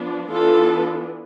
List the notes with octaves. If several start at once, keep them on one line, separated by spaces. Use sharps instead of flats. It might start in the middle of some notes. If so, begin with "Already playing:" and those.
Already playing: F3 B3 D4
E3 B3 D4 F4 A4